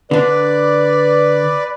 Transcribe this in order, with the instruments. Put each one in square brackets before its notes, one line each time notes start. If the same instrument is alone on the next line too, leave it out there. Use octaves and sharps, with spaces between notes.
[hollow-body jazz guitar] D3 D4 [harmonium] B4 D5